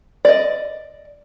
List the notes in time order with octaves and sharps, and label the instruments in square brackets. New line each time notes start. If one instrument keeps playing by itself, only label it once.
[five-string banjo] D5 D#5